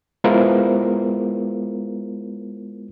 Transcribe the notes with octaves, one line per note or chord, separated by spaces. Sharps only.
G#3 B3 E4 F4 A#4 C5